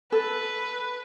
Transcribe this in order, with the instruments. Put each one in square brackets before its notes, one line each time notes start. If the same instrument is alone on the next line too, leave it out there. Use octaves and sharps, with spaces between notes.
[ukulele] A4 [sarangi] B4